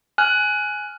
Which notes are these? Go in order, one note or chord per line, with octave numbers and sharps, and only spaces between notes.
G#5 F6 F#6